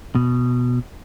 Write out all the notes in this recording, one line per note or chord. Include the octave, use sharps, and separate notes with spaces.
B2